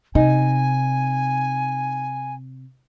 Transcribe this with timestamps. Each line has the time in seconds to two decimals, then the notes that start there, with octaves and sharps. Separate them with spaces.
0.15 C3 D#4 G#5